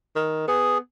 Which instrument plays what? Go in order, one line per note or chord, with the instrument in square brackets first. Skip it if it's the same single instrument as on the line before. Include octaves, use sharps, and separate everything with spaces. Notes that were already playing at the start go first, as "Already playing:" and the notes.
[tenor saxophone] D#3
[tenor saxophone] B3 [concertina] G#4